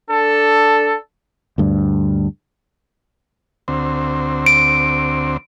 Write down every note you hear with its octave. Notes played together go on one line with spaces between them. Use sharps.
D4 A4
D2 G2
D2 C4
D7